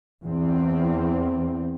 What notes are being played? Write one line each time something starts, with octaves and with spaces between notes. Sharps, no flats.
E2 C4